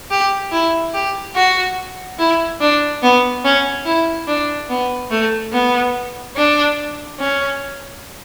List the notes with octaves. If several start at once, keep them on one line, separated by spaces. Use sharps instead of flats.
G4
E4
G4
F#4
E4
D4
B3
C#4
E4
D4
B3
A3
B3
D4
C#4